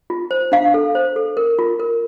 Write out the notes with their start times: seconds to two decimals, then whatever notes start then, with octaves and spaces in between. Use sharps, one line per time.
0.10 F4
0.31 C5
0.52 D4 F5
0.74 A4
0.95 C5
1.16 A4
1.37 A#4
1.59 F4
1.80 A#4